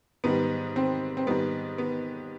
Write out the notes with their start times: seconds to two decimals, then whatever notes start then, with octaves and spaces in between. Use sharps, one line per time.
0.24 G#2 D#3 G3 B3
0.76 C4
1.17 C4
1.27 G#2 D#3 G3 B3
1.78 B3